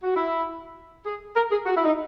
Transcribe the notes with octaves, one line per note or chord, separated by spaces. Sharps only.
F#4
E4
G#4
A#4
G#4
F#4
E4
D#4